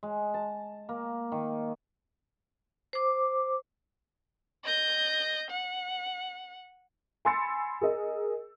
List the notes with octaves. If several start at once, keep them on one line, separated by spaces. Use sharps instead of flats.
G#3
A5
A#3
D#3
C5 D6
D#5 G6
F#5
G#5 B5 C6 E6 A6 C#7
G#4 A#4 D#5